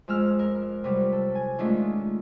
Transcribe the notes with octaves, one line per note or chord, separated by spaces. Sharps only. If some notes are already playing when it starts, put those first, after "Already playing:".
F2 G#3 E6 F6
A#4
C3 F#3 G3
A4
G#5
D#3 G#3 A3 C#4 D4 F4